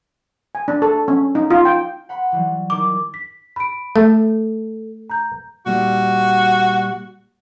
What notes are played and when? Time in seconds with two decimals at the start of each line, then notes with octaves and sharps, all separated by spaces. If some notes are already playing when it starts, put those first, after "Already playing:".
0.55 G#5
0.68 D4
0.82 A4
1.08 C#4
1.35 D#4
1.51 F4
1.65 G5
2.09 F#5 B5 C6
2.32 E3 F#3 G3
2.70 D#3 D6
3.14 B6
3.56 B5 D7
3.96 A3 A4
5.10 A#5 G6
5.66 A#2 G3 F#4